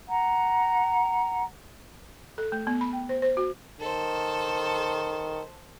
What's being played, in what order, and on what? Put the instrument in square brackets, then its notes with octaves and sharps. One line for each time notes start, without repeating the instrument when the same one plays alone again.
[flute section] F#5 A#5
[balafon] A4
A3
B3
B5
G5
C5
C5
F#4
[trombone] D#3 [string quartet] A4 C5